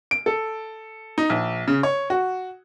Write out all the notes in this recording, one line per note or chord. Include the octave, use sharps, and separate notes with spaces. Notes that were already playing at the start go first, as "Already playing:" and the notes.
D7
A4
D#4
A#1
C#3
C#5
F#4